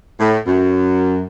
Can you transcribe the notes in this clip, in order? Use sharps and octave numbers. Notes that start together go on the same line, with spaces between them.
A2
F#2